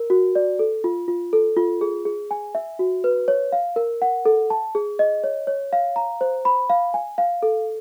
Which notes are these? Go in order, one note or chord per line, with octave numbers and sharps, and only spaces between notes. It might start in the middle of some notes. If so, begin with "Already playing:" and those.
Already playing: A#4
F#4
D5
A4
F4
F4
A4
F4
G#4
G#4
G#5
E5
F#4
B4
C#5
F5
A#4
F#5
A4
A5
G#4
D#5
C#5
C#5
F5
A#5
C5
B5
F5
G#5
F5
A4